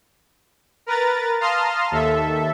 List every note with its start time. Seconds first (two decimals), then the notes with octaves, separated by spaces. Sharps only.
0.86 A#4 B4 A#5 A6
1.41 F5 A5 A#5 C6 D#6 F6
1.91 D#2 A4 E5